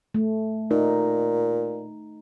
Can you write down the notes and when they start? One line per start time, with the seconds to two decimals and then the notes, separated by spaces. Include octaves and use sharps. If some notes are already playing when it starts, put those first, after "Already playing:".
0.14 A3
0.71 A#2 D#4